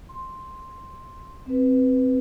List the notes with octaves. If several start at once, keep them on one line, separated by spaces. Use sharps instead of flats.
C6
C4 B4